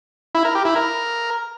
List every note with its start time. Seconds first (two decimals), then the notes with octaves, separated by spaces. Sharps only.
0.35 E4
0.45 A#4
0.55 G4
0.65 E4
0.76 A#4